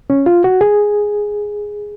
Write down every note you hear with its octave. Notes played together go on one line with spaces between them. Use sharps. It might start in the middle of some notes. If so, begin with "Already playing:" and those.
C#4
F4
F#4
G#4